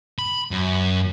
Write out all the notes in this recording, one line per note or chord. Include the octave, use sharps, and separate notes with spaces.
B5
F#2